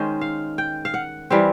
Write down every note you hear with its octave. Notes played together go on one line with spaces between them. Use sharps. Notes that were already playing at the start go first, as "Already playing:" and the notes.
Already playing: D#3 G#3 C#4 C5
F5
G5
F5
F#5
E3 G3 C4 F5